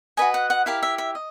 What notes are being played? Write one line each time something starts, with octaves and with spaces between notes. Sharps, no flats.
F#4 B4 D#5 G#5
F#5
F#5
E4 G4 A#4 F5
E5
E5
D#5